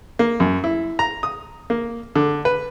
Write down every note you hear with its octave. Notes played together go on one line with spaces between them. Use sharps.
A#3
F#2
E4
A#5
D#6
A#3
D3
B4